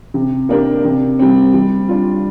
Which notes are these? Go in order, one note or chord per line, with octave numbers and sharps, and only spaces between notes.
C3
A#3 D4 G4 A#4
C3
G3 C4
G3
D4 F4